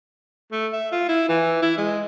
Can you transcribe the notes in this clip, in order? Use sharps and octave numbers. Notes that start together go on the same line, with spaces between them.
A3
E5
F4
E4
E3
E4
G#3